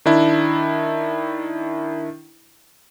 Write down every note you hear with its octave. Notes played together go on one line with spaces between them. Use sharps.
D#3 D4 E4